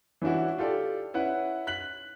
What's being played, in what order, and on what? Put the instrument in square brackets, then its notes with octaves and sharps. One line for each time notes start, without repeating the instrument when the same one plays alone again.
[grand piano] E3 C#4 D4 E4 F#4
F4 G4 A4 D5
C#4 E4 B4 F#5
F#6 B6 F#7